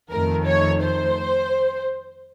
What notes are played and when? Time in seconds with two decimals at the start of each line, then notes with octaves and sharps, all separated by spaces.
0.10 F2 D#3 A3 A#4
0.46 C#5
0.82 C5